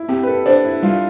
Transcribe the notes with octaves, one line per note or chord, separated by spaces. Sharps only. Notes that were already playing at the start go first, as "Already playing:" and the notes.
Already playing: E4
C4 G4
B4
A4
D4 C5
E4
G3 F4